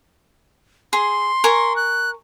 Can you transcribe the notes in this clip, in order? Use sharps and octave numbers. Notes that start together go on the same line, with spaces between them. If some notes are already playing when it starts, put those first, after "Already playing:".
G#4 C6
A#4 G#5 C#6
F#6